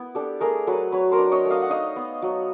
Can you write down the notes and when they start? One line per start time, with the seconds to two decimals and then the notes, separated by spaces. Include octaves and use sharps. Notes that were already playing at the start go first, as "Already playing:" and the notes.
Already playing: B3 E4
0.15 D4 G4 A4
0.41 A3 G#4 A#4
0.67 F#3 A4 B4
0.92 F#3 B4 C#5
1.12 A#4 C5
1.18 D4
1.32 C#5 D#5
1.45 A3
1.50 D#5 F5
1.62 F#5
1.70 D#4 D#5 F5
1.96 B3
2.22 F#3